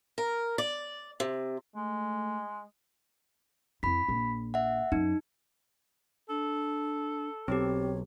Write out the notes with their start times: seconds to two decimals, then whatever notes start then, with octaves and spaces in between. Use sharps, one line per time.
0.18 A#4
0.58 D5
1.20 C3
1.76 G#3 A3
3.83 F2 E4 B5 B6
4.08 A#1
4.54 E5 F#5
4.92 F#2 D#4
6.29 D4 A4
7.48 B1 C4 G4 C#5